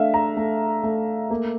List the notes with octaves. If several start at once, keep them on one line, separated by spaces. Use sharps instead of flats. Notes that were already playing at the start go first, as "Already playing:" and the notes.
Already playing: A3 D4 E5 F5
A#5
A3
A3
A#3